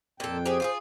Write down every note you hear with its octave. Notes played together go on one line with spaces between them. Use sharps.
F2 A#2 A4 G5
G4 G#4 C5
F4 G4 G#4